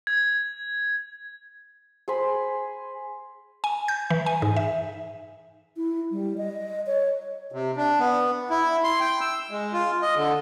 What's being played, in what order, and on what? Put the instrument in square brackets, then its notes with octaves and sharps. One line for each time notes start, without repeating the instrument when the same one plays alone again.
[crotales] G#6
[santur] G#4 C5 G#5 B5
[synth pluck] G#5
G6
E3
G#5
G#2
E5
[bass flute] E4
G3
D#5
C#5
[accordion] C3
D4
B3
E4
C6
G5
E6
G#3
F4
D#5
D3